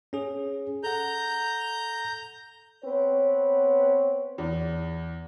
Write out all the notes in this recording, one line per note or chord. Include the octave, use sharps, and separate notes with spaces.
C#4 G#4
A4 F#5 A#5 G6
B3 C4 B4 C#5
E2